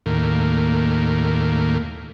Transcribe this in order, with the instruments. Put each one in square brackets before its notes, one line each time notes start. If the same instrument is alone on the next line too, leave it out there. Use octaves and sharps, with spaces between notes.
[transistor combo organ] D#2 A2 A#3